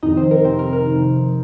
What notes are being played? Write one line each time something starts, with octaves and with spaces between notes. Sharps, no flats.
F2 C3 D#3 D#4 D#5
C4 C5
A#4
F2 C3 D#3 C4 C5
A#4
A#4
F2 C3 D#3